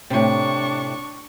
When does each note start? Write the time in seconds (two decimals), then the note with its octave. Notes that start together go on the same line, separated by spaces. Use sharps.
0.10 A2 C3 D4 C#6